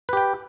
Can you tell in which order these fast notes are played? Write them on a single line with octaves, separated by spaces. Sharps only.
B4 G4 G5